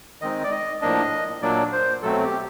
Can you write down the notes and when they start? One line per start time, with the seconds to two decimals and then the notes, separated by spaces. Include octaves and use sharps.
0.21 D#3 G#3 C4 D#4 D#5
0.44 D5
0.52 D#5
0.81 A2 F3 A#3 D4 D#5
1.42 A#2 F#3 A#3 D4 D5
1.72 C5
2.02 B2 F#3 A3 C4 A4
2.24 G4